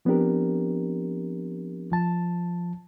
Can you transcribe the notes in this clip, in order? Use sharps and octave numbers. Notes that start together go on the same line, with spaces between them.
F3 B3 C4 D4 G4 A#4
F3 A5